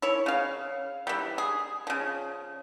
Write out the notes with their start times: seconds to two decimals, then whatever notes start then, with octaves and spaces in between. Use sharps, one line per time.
0.02 E4 C#5
0.26 C#3 F5
1.07 E3 G3
1.38 G#4
1.87 C#3 F3